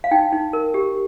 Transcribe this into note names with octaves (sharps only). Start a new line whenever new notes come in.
F5
D#4 G5
D#4
A#4
G4